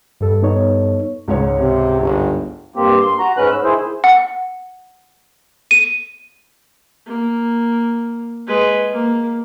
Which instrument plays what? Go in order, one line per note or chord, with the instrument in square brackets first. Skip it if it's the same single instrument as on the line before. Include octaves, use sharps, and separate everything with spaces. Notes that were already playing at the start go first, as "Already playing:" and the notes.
[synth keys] G2 A4
[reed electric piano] B3 D#4 C#5
[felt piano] C#2 G#2 C#5
[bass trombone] C3
G1
[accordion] G2 A#3 C4 G4
G2 C6
F#4 A#5
G#2 G#3 C#4 B4 F#6
E6
D#3 E4 G#4 C5
[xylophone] F#5
D#7
[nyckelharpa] A#3
G#3 B4
A#3